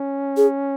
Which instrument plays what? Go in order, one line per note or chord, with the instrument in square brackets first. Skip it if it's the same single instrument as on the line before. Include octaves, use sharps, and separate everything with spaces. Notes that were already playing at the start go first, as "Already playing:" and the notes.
Already playing: [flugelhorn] C#4
[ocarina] G#4